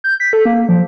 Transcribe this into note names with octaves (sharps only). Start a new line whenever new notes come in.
G6
B6
A4
A#3
F3